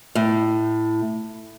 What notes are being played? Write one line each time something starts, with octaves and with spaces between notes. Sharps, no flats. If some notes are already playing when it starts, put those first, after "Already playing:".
A2